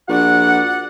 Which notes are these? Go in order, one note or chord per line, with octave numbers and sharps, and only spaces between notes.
A#1 F#4 D5 F#5